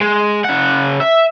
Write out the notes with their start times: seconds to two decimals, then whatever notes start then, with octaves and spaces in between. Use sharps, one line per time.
0.01 G#3
0.45 C#3 F#5
1.00 E5